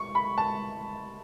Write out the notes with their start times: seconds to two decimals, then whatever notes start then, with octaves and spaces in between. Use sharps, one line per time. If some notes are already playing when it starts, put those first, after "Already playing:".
Already playing: C#6
0.15 B5
0.38 A5